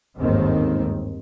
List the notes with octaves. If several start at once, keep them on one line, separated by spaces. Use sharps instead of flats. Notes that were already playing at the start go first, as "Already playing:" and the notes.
G1 D#2 G#2 D#3 C4